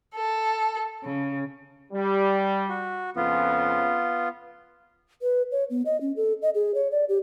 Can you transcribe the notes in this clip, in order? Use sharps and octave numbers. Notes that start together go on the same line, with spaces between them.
A4
C#3
G3
F#4
F2 C#3 B3 F4
B4
C#5
B3
D#5
C#4
A4
D#5
G#4
C#5
D5
G4